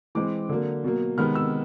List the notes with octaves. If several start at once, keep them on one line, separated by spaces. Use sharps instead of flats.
E3 G#3 C4 D6
D3 F#3 A#3
B2 F#3 A#3
C3 D#3 G#3 B3 F6
E6